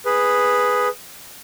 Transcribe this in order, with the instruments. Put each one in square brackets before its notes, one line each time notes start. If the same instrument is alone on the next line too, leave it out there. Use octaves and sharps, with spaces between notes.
[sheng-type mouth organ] G#4 B4